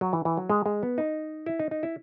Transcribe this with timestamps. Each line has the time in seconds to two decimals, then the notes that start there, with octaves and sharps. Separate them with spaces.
0.01 F#3
0.13 E3
0.25 E3
0.37 F#3
0.50 G#3
0.66 G#3
0.83 B3
0.98 D#4
1.46 E4
1.59 D#4
1.71 D#4
1.83 E4